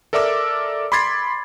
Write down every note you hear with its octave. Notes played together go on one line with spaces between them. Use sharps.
A4 A#4 D5 E5 D6 E6
B5 C6 D6 G#6 A6 C7